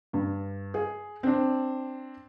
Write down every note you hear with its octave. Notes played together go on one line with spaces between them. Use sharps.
G2
G#4
C4 D4